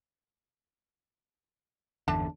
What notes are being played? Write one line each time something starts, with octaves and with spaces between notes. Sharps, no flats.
G1 E2 D3 D4 E5 A5